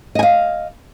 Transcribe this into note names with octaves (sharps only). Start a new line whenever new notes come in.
D#5 F5 G#5